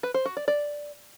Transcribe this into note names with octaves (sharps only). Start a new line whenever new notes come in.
B4
C5
F#4
D5
D5